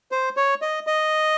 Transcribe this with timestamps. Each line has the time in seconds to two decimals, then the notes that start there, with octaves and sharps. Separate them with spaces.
0.12 C5
0.37 C#5
0.62 D#5
0.87 D#5